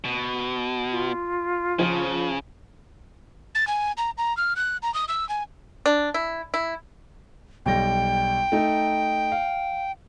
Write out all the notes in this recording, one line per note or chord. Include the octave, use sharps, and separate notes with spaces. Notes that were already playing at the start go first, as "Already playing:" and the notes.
B2
F4
C#3 F3
A6
G#5
A#5
A#5
F6
F#6
A#5
D#6
E6
G#5
D4
E4
E4
B1 G3 G5 A#6
A3 D#4
F5